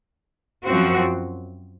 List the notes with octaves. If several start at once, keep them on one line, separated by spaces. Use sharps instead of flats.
F#2 F3 C4 F#4